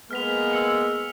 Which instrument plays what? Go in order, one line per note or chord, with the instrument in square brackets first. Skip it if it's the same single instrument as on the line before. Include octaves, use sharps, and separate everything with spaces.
[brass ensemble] G#3 A#3 B3 [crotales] F6 B6 F7
[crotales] E6 C#7